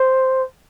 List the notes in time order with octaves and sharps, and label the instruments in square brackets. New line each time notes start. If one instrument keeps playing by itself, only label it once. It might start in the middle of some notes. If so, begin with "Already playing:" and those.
Already playing: [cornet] C5